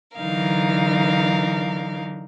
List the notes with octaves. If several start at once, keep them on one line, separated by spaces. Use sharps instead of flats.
D3 E3 F#3 D#4 A#4 F5